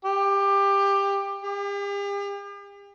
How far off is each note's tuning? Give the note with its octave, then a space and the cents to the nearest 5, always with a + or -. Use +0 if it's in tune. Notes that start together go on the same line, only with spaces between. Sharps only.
G4 +20
G4 +45